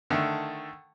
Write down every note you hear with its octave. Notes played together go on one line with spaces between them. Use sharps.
D3 D#3 A3